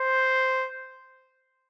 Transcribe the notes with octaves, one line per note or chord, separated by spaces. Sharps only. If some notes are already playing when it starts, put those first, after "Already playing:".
Already playing: C5